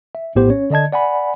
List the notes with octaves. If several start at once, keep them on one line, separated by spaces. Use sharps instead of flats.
E5
A#1 A2 B3 G4 C5
C#4 C#5
D3 D5 D#5 A5 G#6
D5 F#5 G#5 B5